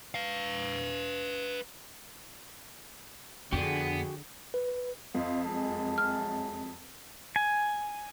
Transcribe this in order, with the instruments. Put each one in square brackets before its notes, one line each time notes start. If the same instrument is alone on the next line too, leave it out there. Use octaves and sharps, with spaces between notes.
[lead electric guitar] B4 F5
[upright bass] F2 [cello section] D3 G#4 [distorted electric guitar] B3 [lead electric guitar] F#4 G5
[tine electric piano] B4
[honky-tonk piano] F2 [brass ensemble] C5 D#5 F5
[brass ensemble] F#2 A5 [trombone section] G#3
[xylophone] F6
[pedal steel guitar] G#5